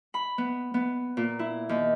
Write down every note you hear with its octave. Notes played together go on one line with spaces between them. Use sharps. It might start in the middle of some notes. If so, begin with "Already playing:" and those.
B5
B3
B3
A#2
E4
D#2